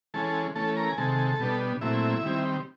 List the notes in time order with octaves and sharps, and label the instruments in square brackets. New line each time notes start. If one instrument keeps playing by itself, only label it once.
[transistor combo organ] E3 G#3 C#4 A4 A5
E3 A3 C#4 A4 A5
A#4 A#5
G#5
C3 D#3 G#3 A4 A5
B2 G3 B3 D4
A#2 F#3 A3 C4 E4 E5
D#3 G3 C4